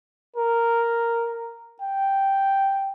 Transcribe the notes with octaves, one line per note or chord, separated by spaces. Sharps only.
A#4
G5